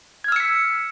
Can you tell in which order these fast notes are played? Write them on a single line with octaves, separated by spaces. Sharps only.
G#6 F6 E6 C#7 B6